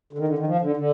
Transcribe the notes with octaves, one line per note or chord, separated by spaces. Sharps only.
D3
D#3
D3
D#3
F3
D3
D3